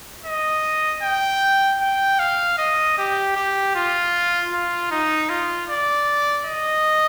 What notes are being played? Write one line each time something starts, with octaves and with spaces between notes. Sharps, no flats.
D#5
G5
G5
F5
D#5
G4
G4
F4
F4
D#4
F4
D5
D#5